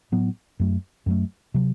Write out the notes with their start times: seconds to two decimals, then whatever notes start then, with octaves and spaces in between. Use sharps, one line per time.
0.12 A2 F#3 B3
0.60 F#2 F#3 A3
1.06 F#2 F#3 A3
1.54 C3 F#3